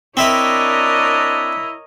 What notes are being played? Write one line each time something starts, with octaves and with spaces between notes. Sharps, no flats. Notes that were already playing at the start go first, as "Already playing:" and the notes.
C4 D4 E4 A#4 C#5 D#5 E5 B5